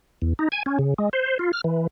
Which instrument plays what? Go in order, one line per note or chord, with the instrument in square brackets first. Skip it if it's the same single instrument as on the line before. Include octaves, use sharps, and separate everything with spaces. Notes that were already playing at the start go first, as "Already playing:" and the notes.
[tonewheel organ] E2
D#4
G#5
C#4
C#3
G#3
C5
F4
F6
E3